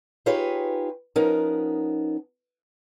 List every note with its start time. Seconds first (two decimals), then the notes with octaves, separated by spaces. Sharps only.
0.26 D#4 F4 G4 G#4 B4 C#5
1.16 F3 B3 C#4 D#4 A#4